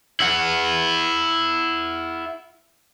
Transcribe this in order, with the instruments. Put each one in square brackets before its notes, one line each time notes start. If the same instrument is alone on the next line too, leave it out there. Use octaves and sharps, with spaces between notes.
[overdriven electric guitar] E4 F#5